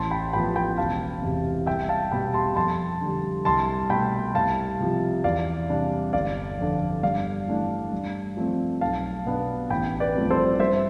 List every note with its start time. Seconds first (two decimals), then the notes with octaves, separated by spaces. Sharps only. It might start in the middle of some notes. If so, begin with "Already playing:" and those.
Already playing: A1 A5 C6
0.10 G5 B5
0.33 A2 F3 B3 G5 B5
0.55 G5 B5
0.78 E1 F5 A5
1.22 E2 C3
1.66 C2 E5 G5
1.89 F5 A5
2.12 B2 G3 G5 B5
2.34 A5 C6
2.56 F2 A5 C6
3.01 D3 G3
3.45 C2 A5 C6
3.90 B2 G5 B5
3.95 A3
4.34 C2 F5 A5
4.80 C3 F3
5.24 E2 D5 F5
5.69 C3 G3 D4
6.13 G1 D5 F5
6.59 F2 D3
7.03 G2 D5 F5
7.47 E3 A3 D4
7.92 G2
8.37 F3 A3 C4
8.81 B1 F5 A5
9.26 B2 B3 D4
9.70 A1 G5 B5
10.00 B4 D5
10.15 G2 F3 A3 C4
10.30 A4 C5
10.59 G2 C5 E5